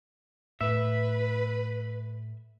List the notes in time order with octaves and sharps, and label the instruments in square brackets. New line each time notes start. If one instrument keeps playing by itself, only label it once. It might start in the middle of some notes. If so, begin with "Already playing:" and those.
[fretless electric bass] A2 [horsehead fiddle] B4 [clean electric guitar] E5